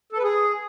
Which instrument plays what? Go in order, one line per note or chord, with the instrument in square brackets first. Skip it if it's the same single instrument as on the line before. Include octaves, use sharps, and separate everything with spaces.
[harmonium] A4
B4
G#4